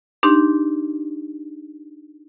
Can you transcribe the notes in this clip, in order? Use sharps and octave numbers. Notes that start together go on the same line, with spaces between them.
D4 D#4 G4 C6